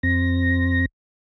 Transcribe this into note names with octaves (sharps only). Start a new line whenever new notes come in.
F2 C4 A#6